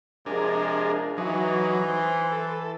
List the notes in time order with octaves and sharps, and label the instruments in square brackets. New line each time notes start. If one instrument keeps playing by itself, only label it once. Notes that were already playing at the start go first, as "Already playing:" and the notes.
[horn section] C3 F3 G#3 [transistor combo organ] D4 G#4 A#4
[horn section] E3 [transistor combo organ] F#3 D#4
[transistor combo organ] C5
A4